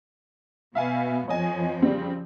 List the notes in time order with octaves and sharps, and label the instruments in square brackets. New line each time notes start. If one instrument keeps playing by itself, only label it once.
[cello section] B2 B3 [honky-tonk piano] E5 F5 G#5
[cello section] F2 F3 [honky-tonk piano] C#5 D#5 G#5
[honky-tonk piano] C#3 G3 C4